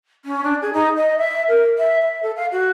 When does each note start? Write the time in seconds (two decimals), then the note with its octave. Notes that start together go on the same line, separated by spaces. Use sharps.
0.25 C#4
0.44 D4
0.62 G#4
0.73 D#4
0.97 D#5
1.18 E5
1.48 A#4
1.78 E5
2.01 E5
2.22 A4
2.36 F5
2.52 F#4